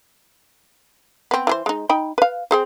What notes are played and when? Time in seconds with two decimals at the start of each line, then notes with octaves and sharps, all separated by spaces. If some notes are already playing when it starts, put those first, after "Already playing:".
1.31 B3 C4
1.47 E3 G#4 C5
1.66 G#3 D#4
1.89 D#4 G5 B5
2.18 B4 F5
2.51 C4 G#4 C5